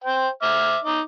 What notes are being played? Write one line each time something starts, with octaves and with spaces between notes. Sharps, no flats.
C5 G5
E5 D6 F6
D#4 D#5 D6